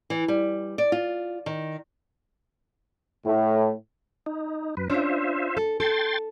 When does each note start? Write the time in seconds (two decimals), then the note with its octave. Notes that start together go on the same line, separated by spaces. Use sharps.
0.10 E3
0.28 G3
0.78 D5
0.92 F4
1.46 D#3
3.26 A2
4.26 D#4
4.77 F#2 B4
4.90 C#4 D4 F4 C5 E5
5.57 A4
5.80 A4 G5 C6 A6